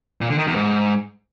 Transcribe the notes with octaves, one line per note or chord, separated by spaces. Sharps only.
A#2
D3
D#3
E2
G#2